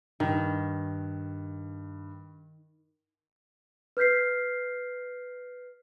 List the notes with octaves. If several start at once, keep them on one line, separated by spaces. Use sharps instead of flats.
G2 D#3
B4 F6 G6 B6 C7